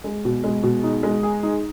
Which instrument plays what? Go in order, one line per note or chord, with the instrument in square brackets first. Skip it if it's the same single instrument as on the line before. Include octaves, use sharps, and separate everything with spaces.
[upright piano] G#3
B2
G#3
B2
D#4
G#3
G#4
D#4